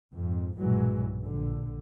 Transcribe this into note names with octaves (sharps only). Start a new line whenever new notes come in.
F2 G#2
B1 G2 A#2 E3 F#3 G#3
A#1 D3